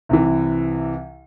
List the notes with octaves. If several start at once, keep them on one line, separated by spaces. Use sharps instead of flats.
C2 C3 E3